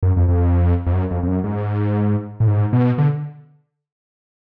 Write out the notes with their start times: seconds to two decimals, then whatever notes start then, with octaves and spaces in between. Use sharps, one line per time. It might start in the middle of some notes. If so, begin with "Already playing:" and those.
0.03 F#2
0.17 F2
0.28 F2
0.86 F2
0.93 F#2
1.11 F2
1.23 F2
1.27 F#2
1.44 G#2
2.40 A2
2.48 G#2
2.73 B2
2.98 D3